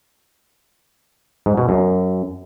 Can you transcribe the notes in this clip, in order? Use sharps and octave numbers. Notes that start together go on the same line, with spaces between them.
G#2
B2
F#2